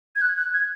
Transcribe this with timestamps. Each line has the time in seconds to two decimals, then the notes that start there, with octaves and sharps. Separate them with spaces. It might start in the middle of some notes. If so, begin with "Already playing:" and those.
0.16 G#6
0.22 F#6
0.37 F#6
0.53 G#6